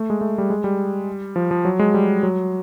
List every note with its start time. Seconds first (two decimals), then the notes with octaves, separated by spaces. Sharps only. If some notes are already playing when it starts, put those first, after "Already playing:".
Already playing: A3
0.10 G#3
0.21 A3
0.38 G3
0.50 G#3
0.64 G3
1.36 F3
1.51 F3
1.65 F#3
1.79 G#3
1.94 G3
2.23 F#3